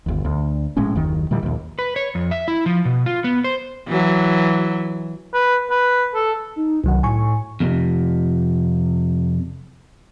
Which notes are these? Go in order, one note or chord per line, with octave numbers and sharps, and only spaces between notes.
G1 D#2
D2
A#1 A2 G#3 C#4
F#1 D#2 D#3
A#2 D#3 E3 G3
A#1 D#2
B4
C#5
F2
E5
E4
F3
B2
F4
B3
C5
E3 F#3
B4
B4
A4
D#4
C2 D#3 F#3 F#5
A2 G#5 C#6
F2 C3